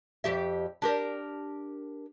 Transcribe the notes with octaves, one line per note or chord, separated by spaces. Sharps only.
F2 G4 E5
D4 G4 A#4